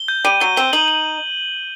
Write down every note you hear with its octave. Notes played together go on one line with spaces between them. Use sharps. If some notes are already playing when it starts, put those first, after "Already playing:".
Already playing: G7
G6
G3 D#7
F#3 G7
C4 G7
D#4 F#7
F#7